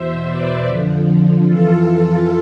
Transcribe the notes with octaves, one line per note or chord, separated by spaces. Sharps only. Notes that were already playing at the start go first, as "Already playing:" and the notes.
Already playing: E2 B2 C5 E5
B4 D5
F2 D3 F3
F2 E3 F4 A4